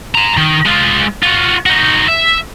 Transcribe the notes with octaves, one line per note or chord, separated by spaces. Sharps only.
G#5 A#5
D#3
G#3 F4
F4 F#4
D#4 F#4
E5